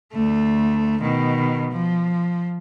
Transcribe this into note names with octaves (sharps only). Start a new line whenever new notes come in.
D2 A3
B2 D#3
F3